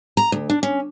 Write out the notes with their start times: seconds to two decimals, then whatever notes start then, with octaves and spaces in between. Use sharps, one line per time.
0.17 A#5
0.32 D2
0.50 D4
0.63 C#4